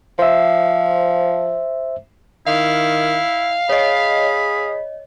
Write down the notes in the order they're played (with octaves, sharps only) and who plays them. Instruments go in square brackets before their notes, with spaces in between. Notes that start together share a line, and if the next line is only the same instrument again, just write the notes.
[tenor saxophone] F3 [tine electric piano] C5 E5
[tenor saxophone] D#3 [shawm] E4 [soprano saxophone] F5
[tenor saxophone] G#4 [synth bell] C#5 D#5 [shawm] B5